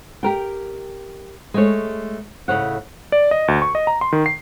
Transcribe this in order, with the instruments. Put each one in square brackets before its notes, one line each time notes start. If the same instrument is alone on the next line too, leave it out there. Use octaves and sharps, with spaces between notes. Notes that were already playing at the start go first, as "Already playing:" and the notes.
[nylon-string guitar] G4 A#4 G5
G#3 A3 C#5
A2 C#3 C#5 F#5
[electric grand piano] D5
D#5
D2
C#6
D#5
A#5
C6
D#3
C7